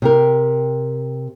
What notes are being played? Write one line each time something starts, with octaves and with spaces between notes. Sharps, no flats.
C3 G4 A#4